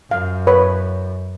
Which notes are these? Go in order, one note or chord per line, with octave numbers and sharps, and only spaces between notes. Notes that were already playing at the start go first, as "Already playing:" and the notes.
F#2 F5
B4 C#5 B5